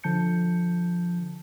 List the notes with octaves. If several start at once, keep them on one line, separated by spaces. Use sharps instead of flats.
D3 F3 A5 G6 C#7